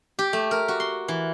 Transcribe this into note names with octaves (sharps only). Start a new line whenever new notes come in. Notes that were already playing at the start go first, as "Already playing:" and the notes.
G4
A3
A#4
F#4
C6
E3